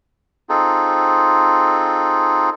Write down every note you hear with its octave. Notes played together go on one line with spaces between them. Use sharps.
C4 D#4 F4 G#4 A4